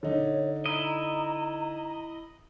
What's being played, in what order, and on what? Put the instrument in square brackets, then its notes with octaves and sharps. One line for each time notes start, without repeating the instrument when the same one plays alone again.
[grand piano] D3 D#4 [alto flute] C#5
[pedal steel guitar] E4 D#5 [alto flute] A#5